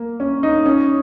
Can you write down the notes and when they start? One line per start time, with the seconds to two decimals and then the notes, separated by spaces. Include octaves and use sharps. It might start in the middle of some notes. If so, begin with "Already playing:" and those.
Already playing: A#3
0.20 C#4
0.43 D#4
0.66 C#4